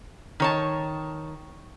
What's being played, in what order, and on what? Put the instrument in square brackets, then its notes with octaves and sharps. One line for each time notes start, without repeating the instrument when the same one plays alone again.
[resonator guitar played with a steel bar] D#3 C#5 A5